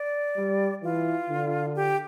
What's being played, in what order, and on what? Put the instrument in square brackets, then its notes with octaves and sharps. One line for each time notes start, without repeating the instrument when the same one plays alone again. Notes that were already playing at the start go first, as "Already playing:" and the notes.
Already playing: [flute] D5
[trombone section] G3
[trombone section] E3 [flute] F4
[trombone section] D3
[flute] G4